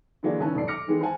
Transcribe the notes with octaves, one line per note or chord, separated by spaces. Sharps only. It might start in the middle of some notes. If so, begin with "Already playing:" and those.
D3 E3 F#3 G#3 A#3 D4
B1 E3 C#4 B4 A5
D#1 F#2 B2 D5 C7
D6 F6 A#6 C#7
D#3 E3 G#3 B3
C5 F#5 G#5 A5